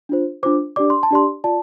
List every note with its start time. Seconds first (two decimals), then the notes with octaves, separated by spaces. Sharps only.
0.09 D4 F4 C5
0.43 D4 F4 C5 D6
0.76 D4 G4 D5 D6
0.90 C6
1.03 A5
1.11 D4 G4 D5 C6
1.44 F4 D5 A5